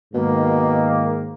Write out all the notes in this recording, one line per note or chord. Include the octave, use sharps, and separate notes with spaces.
G#2 B2 D#3 A#3